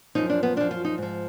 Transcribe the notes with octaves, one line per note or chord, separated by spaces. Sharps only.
F#2 F3 D#4
D4
B3
F#2 F3 D4
F4
D#4
G#2 F3